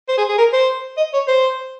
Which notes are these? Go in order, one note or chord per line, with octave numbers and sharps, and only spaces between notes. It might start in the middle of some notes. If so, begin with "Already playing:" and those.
C5
G#4
G#4
A#4
C5
D#5
C#5
C5